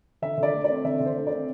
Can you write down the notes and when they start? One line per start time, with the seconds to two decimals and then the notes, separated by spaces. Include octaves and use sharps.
0.22 D3 E5
0.37 D3
0.43 D5
0.54 A3
0.64 C4 D5
0.84 D3 E5
1.00 D3
1.05 C5
1.16 A3
1.27 C4 D5